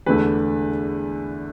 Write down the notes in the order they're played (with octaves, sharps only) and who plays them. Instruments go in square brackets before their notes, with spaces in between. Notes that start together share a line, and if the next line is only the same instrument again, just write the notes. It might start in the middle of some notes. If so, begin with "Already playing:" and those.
[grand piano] E2 D3 A3 B4